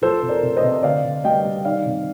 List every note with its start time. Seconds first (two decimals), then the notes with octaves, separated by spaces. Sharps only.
0.02 F3 A4 C5
0.22 C3
0.29 A#4 D5
0.43 C3
0.56 C5 D#5
0.63 C3
0.83 D3 D5 F5
1.04 D3
1.24 G3 D#5 G5
1.45 G3
1.65 D#3 D5 F5
1.85 C3